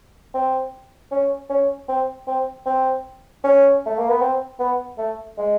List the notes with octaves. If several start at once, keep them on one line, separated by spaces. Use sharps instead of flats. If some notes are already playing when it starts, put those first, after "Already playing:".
C4
C#4
C#4
C4
C4
C4
C#4
A3
A#3
B3
C4
B3
A3
G#3